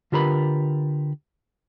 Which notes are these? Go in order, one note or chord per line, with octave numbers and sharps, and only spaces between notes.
D3 F4 G4 A#4 B4 B5